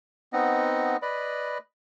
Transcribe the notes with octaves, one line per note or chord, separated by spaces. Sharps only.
B3 C4 D#4 D#5 F#5
B4 D5 D#5 B5